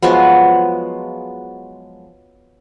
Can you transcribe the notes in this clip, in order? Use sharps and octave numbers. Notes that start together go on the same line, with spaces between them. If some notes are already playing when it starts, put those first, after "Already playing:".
F3 F#3 G#3 B3